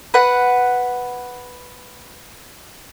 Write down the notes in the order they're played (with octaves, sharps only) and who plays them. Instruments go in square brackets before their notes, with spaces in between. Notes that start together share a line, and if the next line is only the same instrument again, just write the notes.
[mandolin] B4 F#5